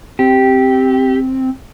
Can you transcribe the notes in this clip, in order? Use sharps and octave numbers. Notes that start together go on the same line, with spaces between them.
C4 G4